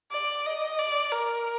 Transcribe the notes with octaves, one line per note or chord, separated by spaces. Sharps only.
D5
D#5
D5
A#4